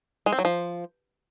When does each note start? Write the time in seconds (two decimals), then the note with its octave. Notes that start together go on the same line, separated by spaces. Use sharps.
0.26 G#3
0.32 C4
0.39 F#3
0.45 F3